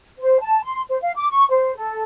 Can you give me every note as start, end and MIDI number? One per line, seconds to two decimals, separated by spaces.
0.19 0.37 72
0.40 0.61 81
0.63 0.81 84
0.89 0.97 72
1.01 1.12 77
1.15 1.28 86
1.31 1.45 85
1.49 1.75 72
1.76 2.04 69